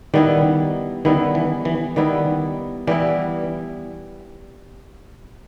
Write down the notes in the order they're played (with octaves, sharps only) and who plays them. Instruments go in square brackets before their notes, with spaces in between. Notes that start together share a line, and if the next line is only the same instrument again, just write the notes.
[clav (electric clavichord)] D#3 [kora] G3 B3 E4
[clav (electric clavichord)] D#3 [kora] G3 B3 E4
[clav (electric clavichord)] E3
E3
[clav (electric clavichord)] D#3 [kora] G3 B3 E4
[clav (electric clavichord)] E3 [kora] G3 B3 E4